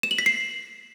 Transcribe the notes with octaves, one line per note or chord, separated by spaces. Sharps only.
E7
F#7
B6
C7